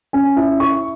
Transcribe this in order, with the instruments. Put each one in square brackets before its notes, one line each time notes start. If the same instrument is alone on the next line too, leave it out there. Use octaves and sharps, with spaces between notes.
[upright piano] C#4 G#5
E4
E4 C#6